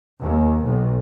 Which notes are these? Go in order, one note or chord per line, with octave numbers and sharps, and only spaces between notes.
D#2
B1